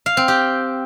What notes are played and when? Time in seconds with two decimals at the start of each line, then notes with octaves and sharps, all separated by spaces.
0.06 F5
0.17 C4
0.28 G4